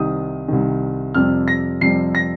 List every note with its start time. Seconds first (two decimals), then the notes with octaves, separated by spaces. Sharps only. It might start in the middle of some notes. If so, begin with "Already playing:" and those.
Already playing: C2 C3 D#3 D#6
0.48 C2 C3 D#3
1.14 F2 C3 G3 F6
1.48 A#6
1.81 F2 C3 G3 C7
2.15 A#6